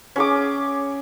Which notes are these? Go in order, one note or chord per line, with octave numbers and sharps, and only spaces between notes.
C#4 G#4 D6